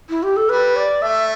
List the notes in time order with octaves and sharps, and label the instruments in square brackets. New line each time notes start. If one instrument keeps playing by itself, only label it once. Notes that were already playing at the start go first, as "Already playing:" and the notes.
[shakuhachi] E4
G4
A4
[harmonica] G3 [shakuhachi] B4
[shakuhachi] D5
[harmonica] A3 [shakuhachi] E5